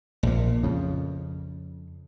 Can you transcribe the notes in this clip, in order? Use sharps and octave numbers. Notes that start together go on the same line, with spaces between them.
A#1 A#2
F2 C#3